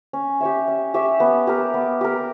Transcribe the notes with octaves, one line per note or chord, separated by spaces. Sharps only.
C#4
G4 C#5 E5
C#4
G4 C#5 E5
B3
G4 A#4
B3
G4 A#4